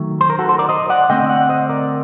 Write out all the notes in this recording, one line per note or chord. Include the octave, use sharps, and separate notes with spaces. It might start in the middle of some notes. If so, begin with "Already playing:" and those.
Already playing: D#3 F#3 A3
C5
A#4
F#4 A4
A4 C5
A#4 D5
C5 D#5
D5 F#5
D3 A3 C4 D#5 G5
D#5
D5 F#5
C5 D#5
A#4 D5